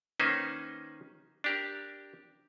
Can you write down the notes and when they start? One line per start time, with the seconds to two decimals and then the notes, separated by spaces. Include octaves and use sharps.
0.19 D#3 A#3 C#4 D#4 B4 C5
1.44 D4 G4 A#4